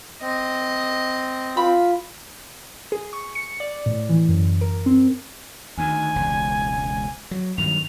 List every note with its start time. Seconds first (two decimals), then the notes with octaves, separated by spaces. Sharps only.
0.22 C4 D#5
1.57 F4 B5
2.92 G#4
3.13 C#6
3.35 C#7
3.60 D5
3.86 A2
4.09 E3
4.29 F#2
4.61 A#4
4.86 C4
5.77 D2 D#3 G#5
6.16 E1 C#2
7.31 F#3
7.58 G2 D#3 F#3 F7